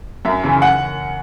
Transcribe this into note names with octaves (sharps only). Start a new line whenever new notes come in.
F#2 E5
C#3 E3
F#5